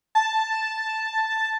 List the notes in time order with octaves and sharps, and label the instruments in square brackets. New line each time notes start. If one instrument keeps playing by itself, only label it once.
[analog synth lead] A5